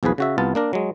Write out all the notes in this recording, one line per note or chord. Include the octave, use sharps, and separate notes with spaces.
B1 E2 F3 G#4 B4
C#3 F#4 E5
C2 B3 F4 A5
A#3 D4 A#4
F#3 G#3